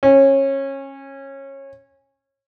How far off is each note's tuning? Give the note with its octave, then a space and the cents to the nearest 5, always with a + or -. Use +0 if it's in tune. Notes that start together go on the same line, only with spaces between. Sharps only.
C#4 -25